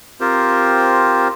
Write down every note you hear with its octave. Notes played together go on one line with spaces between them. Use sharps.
C4 F4 G4 A#4 C5